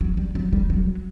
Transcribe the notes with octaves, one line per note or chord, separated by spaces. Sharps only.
F#3
G3
F#3
G3
F#3